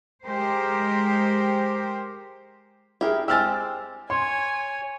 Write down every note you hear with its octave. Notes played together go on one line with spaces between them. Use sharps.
G#3 G4 A#4 C5
E4 G4 G#4 A#4
G#3 C4 G4 E6 F6 A6
C#5 G#5 C6